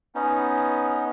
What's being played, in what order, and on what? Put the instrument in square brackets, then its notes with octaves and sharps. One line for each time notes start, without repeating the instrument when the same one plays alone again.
[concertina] B3 C#4 D#4